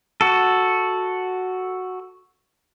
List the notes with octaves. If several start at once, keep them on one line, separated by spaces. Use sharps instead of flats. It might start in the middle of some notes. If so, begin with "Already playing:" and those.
F#4 A4